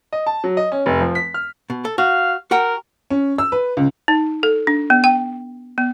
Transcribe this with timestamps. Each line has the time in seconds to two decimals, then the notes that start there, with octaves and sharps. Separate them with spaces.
0.13 D#5
0.26 A5
0.44 F#3
0.57 D#5
0.72 C#4
0.86 F1
1.01 F3
1.15 B6
1.34 F6
1.70 B2
1.85 A4
1.98 F#4 F5
2.51 F#4 A#4 F#5 G5
3.10 C#4
3.38 E6
3.52 B4
3.77 C#2
4.08 D#4
4.43 A4
4.67 D4
4.90 B3
5.04 G5
5.78 B3